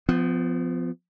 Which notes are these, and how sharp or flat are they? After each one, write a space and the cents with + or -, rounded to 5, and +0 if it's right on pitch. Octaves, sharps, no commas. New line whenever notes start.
F3 +0 B3 +40